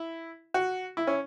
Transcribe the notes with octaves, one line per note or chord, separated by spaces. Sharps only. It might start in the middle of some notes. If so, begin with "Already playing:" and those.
Already playing: E4
F#4
E4
C#4